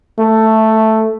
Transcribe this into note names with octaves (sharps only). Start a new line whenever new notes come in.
A3